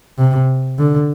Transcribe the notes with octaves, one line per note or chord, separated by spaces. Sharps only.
C3
D3